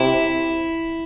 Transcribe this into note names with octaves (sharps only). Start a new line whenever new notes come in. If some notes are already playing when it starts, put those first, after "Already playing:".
Already playing: C3 E4